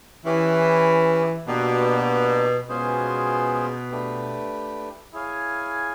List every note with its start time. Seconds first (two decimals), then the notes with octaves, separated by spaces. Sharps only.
0.25 E3 C#4 E4 G4 B4
1.47 B2 A#3 D4 G4
2.69 B2 G#3 C#4 F4 G#4 C5
3.91 A3 D4 G4 B4
5.13 E4 G#4 C#5 F5 G#5